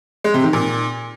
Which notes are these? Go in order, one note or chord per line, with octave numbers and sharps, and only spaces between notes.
G#3
C3
D#3
A#2